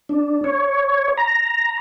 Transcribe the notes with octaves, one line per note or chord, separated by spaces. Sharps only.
D4
C#5
A#5